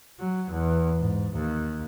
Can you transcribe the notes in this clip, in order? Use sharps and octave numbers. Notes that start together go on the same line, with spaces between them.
F#3
E2
G#2
D#2